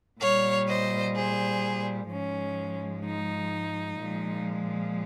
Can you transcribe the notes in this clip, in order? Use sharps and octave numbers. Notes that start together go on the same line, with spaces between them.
A#2 G3 C#5 F5
C5 D#5
G#4 C5
G#2 F3 G#3 C#4
D#4
A#2 F3 G#3